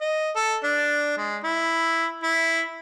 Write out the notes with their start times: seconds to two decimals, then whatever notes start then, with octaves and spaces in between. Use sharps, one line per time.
0.01 D#5
0.35 A4
0.63 D4
1.18 G#3
1.44 E4
2.23 E4